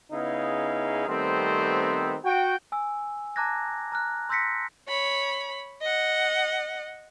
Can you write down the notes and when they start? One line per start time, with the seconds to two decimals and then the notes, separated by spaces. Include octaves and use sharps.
0.12 C#3 B3 D#4 E4 G#4 F5
1.07 D#3 G3 A3 B3 C4
2.24 F#4 G5
2.72 G#5 E6
3.36 A5 A#5 D6 F#6 G#6 A#6
3.92 A#5 F6 F#6
4.29 C6 E6 G6 A#6 B6 C#7
4.88 C#5 B5
5.82 D#5 F#5